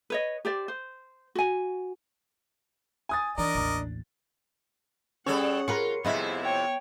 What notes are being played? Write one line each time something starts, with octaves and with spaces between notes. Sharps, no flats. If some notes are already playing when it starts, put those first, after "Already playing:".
B4 C#5 D#5
G4 C5 D5
C5
F#4 G#5
G#5 D#6 A6
E3 D4 A#4 D5 D#5
A1 D#2
G3 C#4 G#4 A4 C#5 F#5
F4 G#4 A#4 B4 C#7
F2 C3 B3 E4 G#4 D#5 E5
C#5 G5